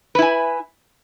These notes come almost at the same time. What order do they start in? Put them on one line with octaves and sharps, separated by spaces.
B4 E4 G#5